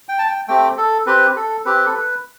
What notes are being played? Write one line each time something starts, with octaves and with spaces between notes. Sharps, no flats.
G5
A5
G5
A3 C4 G4 G5
A4
C4 G4 B4
A4
C4 G4 B4
A4
B4